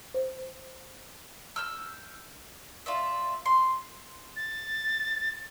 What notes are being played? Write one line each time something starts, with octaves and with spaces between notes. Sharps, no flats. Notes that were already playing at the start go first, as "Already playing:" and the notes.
C5
E6 F6 G6
F4 D5 E5
C6
A6